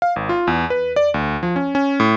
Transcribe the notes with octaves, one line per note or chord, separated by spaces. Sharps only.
F5
G#1
F4
E2
B4
D5
D2
F3
C#4
C#4
A2